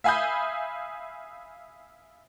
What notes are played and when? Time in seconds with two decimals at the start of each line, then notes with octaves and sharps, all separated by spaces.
0.04 E5 F5 G#5 B5 D#6 G6